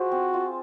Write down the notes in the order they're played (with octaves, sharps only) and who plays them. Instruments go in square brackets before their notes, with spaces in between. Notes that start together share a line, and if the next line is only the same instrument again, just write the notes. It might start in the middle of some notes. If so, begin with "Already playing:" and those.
Already playing: [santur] F4 G#4 C5 [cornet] F#4
[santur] C4
F4